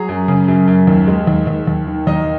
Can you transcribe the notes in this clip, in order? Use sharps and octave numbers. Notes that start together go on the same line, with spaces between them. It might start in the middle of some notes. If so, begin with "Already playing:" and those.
Already playing: F#3 G#4
F#2
C#3
F#2
F#2
D#2
G#3
D#2
D#2
D#2
D#3
D#2 D#4 D#5